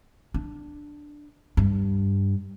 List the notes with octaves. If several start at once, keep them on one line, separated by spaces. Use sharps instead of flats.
D4
G2